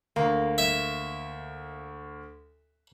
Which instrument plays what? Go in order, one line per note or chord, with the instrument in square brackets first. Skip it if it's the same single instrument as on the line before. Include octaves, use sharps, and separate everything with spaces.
[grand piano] D2 [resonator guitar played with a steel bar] A#3
[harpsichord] E5